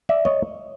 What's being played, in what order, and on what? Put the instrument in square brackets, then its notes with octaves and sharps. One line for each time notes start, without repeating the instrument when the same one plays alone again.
[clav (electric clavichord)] D5 E5
C#5 D#5